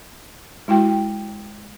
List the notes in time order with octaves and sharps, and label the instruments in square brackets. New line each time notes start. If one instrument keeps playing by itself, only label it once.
[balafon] G#3 E4 F#4 G5